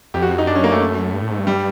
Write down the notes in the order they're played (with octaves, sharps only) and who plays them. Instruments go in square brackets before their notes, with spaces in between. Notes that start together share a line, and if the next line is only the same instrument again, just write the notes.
[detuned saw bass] F2 [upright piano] G4
[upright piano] F#4
D#4
[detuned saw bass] F#2 [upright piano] D4
[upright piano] C#4
A#3
A3
[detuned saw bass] G2
A2
G#2
G2
[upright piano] G3